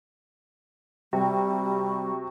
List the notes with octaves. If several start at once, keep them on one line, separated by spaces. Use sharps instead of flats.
C3 G3 F#4